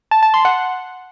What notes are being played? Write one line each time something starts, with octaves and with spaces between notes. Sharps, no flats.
A5
A5
C6
F#5